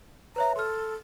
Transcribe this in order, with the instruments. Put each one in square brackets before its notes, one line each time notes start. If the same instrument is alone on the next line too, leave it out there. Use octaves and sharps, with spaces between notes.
[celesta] B4 C#5 E5 [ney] A#5
[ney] A4 [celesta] C6 F6